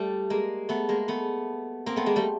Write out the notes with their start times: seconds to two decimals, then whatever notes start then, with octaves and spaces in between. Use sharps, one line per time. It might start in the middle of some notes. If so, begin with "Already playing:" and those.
Already playing: G3 A3
0.30 G#3 A#3
0.69 A3 B3
0.89 G#3 A#3
1.08 A3 B3
1.86 A#3 C4
1.96 A3 B3
2.06 G#3 A#3
2.16 G3 A3